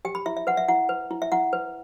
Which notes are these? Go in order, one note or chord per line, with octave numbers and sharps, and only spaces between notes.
G4 G5
B5
E4 E5
E5
B4 F#5
E5
E4 F#5
B4
E4
E5
E4 F#5
B4